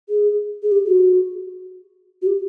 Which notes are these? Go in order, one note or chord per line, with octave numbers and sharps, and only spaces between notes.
G#4
G#4
G4
F#4
F#4
G4